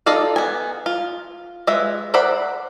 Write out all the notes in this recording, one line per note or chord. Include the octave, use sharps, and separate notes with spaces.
D#4 F4 A4 D5 F5
B3 G#5
F4
G#3 F4 B4 E5
C5 D5 E5 F#5 B5